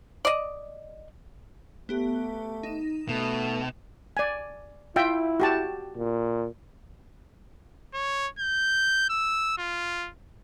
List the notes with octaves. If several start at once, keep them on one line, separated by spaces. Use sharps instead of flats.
D5 D#5
A3 B3 G4
D#4 E7
B2 A3
D5 G#5
E4 F4 E5 G5
F#4 G4 A5
A#2
C#5
G6
E6
F4